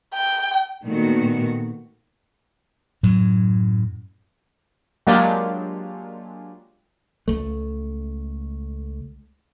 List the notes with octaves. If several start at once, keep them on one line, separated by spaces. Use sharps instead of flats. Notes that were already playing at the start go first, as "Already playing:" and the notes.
G5
A#2 D#3 A3 B3 F#4
F#2 A2 F#3
F#3 G#3 A#3 D4 F4 G4
C#2 A3